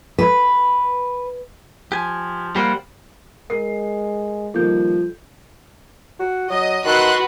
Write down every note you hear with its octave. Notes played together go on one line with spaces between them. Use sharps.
B4
F3 G4 G#5
G3 A#3 G4 C5 F#5
G#3 A#4 C7
D#3 F3 G3 A#3 A4 G6
F#4
F#3 D#5 D#6
D#3 F#4 A4 B4 C6 F#6